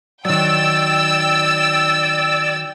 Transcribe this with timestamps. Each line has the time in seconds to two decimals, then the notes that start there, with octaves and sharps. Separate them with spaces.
0.25 D#3 F#3 D5 G5 E6